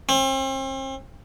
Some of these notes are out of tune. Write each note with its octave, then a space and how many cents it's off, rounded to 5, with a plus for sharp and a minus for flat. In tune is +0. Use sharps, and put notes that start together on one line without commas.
C4 +40